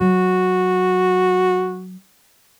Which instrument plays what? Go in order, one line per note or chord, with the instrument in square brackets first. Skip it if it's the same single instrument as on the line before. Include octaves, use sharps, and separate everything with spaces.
[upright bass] F#3 [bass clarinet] F#4